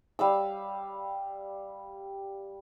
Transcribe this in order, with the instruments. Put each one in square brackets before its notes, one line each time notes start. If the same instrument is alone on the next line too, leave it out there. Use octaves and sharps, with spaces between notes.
[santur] G3 F5 E6